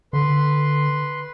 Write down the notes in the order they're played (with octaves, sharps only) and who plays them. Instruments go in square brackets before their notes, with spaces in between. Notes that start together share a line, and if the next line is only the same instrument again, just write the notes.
[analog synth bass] D3 [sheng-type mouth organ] B4 C6